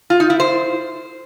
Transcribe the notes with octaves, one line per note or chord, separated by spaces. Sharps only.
F4
D#4
E4
C5